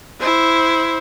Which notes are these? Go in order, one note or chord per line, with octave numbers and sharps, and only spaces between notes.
E4 C5